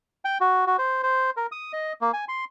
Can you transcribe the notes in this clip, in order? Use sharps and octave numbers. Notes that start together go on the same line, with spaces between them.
G5
F#4
F#4
C5
C5
A#4
D#6
D#5
A#3
G#5
C6